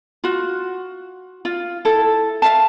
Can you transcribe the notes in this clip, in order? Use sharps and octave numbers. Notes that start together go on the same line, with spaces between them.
F4 F#4
F4
E4 A4
E5 F5 A5